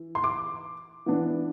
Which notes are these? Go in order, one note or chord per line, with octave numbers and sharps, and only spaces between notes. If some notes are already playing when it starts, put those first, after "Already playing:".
Already playing: E3
C6
D6
E3 B3 D4